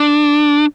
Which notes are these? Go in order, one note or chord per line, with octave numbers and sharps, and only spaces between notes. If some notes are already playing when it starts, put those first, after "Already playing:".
Already playing: D4